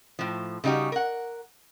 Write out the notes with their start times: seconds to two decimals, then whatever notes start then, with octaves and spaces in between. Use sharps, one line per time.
0.19 A2 F3
0.64 C#3 G3 D#4 F#4 G4
0.92 A#4 F#5